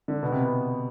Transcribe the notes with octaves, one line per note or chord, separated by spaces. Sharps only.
D3
B2
C3
B3